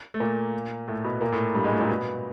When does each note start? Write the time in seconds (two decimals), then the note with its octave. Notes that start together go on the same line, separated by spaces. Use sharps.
0.14 A3
0.20 A#2 A#3
0.88 A2 A3
1.04 B2 B3
1.21 A#2 A#3
1.32 A2 A3
1.55 G2 G3
1.64 G#2 G#3
1.71 A2 A3
1.80 A#2 A#3
1.89 B2 B3